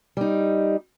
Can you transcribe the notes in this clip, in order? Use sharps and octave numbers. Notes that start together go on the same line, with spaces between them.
G3 D#4